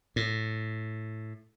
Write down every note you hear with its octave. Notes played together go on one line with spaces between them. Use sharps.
A2